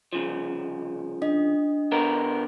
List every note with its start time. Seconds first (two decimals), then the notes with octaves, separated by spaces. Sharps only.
0.13 C2 C#3 F3
1.22 D4 D#5
1.92 D3 B3 A#4